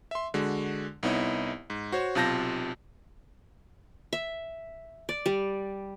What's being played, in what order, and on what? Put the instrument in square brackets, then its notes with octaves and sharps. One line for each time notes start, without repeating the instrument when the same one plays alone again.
[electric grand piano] E5 C6
D3 G#3 F#4
C2 B3 D#4 E4 C#5 D#5
G#2
F#4 C5 C#5
B1 C3 F4 A5 G6 A#6
[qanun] E5
D5
G3